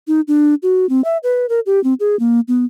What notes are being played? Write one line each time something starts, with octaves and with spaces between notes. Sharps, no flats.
D#4
D4
F#4
C4
E5
B4
A#4
G4
C4
G#4
A#3
B3